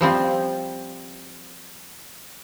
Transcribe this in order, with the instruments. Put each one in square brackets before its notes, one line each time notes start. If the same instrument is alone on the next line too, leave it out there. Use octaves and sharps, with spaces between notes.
[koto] F3 G3 C4 F4